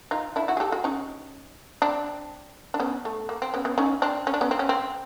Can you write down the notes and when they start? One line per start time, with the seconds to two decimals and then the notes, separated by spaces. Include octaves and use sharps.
0.11 D#4 F4
0.36 D4 E4
0.48 E4 F#4
0.57 G#4
0.60 G4 A4
0.72 F#4 G#4
0.84 C#4 D#4
1.82 C4 D4
2.74 D4
2.80 B3 C#4
3.05 A3
3.29 A#3
3.42 C4
3.54 B3 C#4
3.65 B3 C#4
3.78 C#4 D#4
4.02 C4 D4
4.27 C#4
4.34 D4
4.41 B3 C#4
4.51 C4
4.59 C#4
4.69 C4